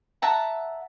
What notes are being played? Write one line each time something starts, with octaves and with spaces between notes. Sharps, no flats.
E5 F#5 A5 A#5